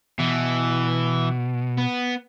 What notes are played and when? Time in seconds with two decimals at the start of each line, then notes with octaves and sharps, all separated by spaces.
0.19 B2 E3
1.78 B3